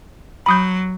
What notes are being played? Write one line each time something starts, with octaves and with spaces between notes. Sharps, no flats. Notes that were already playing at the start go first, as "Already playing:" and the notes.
F#3 B5 D#6 G6